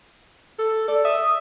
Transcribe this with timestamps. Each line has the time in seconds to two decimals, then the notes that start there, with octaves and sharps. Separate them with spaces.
0.59 A4
0.88 A4 D5
1.04 E5 D#6